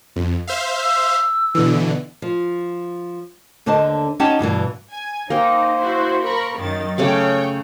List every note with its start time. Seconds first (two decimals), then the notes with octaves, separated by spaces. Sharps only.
0.16 F2
0.48 C5 E5 F5
0.83 E6
1.55 B2 D3 E3
2.22 F3
3.66 D#2 D3 D4 C5 D#5 A5
4.20 C#4 D#4 G4 F#5 G5 A5
4.39 D2 G2 B2 E3
4.92 G#5
5.30 A#3 D#4 C5 G5
5.81 E4 F#4
6.25 A#4 B5 C#6
6.60 F#2 D#3 A6
6.98 C#3 A3 C#5 G5 D6